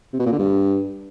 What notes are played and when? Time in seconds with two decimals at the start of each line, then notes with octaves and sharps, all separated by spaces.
0.13 C3
0.20 B2
0.26 A#2
0.32 D3
0.39 G2